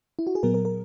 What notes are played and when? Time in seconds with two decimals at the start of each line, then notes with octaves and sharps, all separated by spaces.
0.19 E4
0.27 F#4
0.35 G#4
0.43 A#2 F#3 B3 A#4
0.54 A#4
0.65 A#4